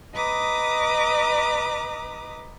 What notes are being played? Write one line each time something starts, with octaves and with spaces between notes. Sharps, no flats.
B4 D#5 A#5 D6 D#6